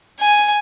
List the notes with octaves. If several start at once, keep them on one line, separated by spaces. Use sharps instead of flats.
G#5